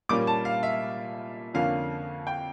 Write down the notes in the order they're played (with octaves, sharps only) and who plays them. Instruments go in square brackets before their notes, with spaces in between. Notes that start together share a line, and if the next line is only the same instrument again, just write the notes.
[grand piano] A#2 G3 A#3 C#4 D6
A5
F5
E5
F2 D3 F3 A#3 C#4 F5
G5